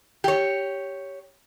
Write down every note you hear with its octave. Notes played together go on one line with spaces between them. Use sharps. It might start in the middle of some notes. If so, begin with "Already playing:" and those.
G4 C#5